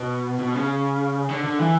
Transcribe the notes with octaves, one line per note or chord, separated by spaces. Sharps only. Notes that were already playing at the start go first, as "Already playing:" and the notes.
Already playing: B2
B2
C#3
D3
D3
E3